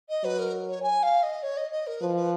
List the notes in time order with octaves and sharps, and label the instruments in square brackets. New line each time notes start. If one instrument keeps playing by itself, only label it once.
[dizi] D#5
[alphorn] F#3 [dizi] B4
[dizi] A#4
C#5
G#5
F5
D#5
C#5
D#5
D#5
A#4
[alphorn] F3 [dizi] B4
[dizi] B4